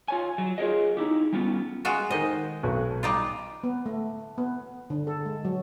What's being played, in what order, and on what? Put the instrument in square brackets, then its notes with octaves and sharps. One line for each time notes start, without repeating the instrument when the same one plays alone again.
[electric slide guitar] F4 C#5 G#5
F#3
F4 G#4 A#4 C#5 D#5
D#4 E4 G4
G3 B3 C#4 F4
[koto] G#3 F4 F#4
[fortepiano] D#3 C5 [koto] D#5
[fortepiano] B1 F#4 B4
[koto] G3 D#4 F4
[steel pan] B3
A3
B3
D3
A4
G#3
F#3